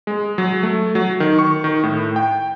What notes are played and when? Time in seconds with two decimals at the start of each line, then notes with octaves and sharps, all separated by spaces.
0.07 G#3
0.38 F#3
0.63 A3
0.95 F#3
1.20 D#3
1.39 C#6
1.64 D#3
1.83 A2
2.16 G5